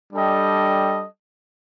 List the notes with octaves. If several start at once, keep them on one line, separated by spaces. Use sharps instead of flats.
G3 D4 A4 D#5 G5